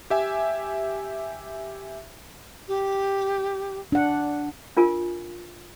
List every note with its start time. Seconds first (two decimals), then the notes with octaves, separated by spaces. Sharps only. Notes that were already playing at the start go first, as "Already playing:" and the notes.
0.10 G4 E5 G#5
2.67 G4
3.92 D4 F#5
4.77 D4 F4 A#4 G#5